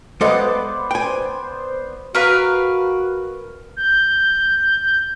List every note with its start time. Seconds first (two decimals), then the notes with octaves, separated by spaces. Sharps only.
0.21 G#3 B3 A4 C5 D5 F5
0.91 G5 G#5
2.15 F#4 A#4 B4 F5
3.77 G6